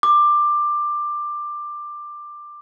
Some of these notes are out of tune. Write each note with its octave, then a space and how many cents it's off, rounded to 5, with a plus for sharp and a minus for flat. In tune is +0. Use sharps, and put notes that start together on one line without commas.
D6 +15